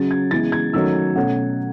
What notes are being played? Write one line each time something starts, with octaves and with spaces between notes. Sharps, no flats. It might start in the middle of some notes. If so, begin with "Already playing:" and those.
Already playing: C#3 F#3 C#4 A6
G#6
C#3 E3 G#3 B3 A6
G#6
D#3 F#3 A3 C#4 E6
B2 A3 C#4 F#5